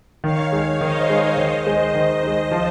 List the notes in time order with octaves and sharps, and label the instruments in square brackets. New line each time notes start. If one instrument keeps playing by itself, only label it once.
[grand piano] D#3 [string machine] C#5 F5
[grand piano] G#3 D#4
[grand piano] D#3 [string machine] C5 D#5
[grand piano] G#3 D#4 [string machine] C#5 F5
[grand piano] D#3 [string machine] C5 D#5
[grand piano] G#3 D#4
D#3
G#3 D#4
F3